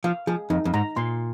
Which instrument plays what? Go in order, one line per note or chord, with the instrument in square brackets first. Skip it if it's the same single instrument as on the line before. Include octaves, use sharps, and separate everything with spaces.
[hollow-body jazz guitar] F3 [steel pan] F5
[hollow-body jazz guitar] F3 [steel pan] G#4
[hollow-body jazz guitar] F2 [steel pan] D#4
[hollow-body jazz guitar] F2
[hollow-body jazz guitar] G#2 [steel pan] A#5
[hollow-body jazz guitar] A#2 [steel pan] C6